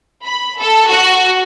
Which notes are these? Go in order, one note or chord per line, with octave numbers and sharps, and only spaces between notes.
B5
A4
F#4